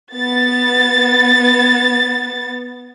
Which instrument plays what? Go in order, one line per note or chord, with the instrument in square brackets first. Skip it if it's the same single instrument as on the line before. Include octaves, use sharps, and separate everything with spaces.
[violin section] B3 A6